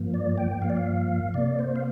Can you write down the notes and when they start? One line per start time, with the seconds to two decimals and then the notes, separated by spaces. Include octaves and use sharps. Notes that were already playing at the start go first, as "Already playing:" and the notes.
Already playing: G2 F3 A#3
0.14 D5
0.38 G5
0.62 G2 F3 A#3 F5
0.70 D5
0.76 F5
1.34 C3 A#3 D5
1.59 C5
1.76 F5